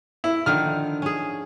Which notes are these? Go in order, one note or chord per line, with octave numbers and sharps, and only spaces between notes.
E4
D3 D#3 F3 F6
C#4 G#4